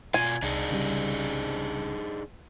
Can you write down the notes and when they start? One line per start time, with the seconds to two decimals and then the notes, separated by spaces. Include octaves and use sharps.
0.14 B2 F4 G#5
0.43 C2 D4 D#4 G#4
0.71 C2 C#3 G3